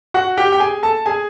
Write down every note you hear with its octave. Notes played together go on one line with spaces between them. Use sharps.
F#4 F#5
G4 G5
G5
G#4 G#5
A4 A5
G#4 G#5